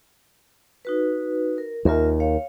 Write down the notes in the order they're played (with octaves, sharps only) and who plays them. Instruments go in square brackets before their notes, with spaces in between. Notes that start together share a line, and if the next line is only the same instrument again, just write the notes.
[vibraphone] D#4 F#4 B4
A#4
[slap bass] D#2 [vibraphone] F4 A#4 E5
[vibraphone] C#5 F5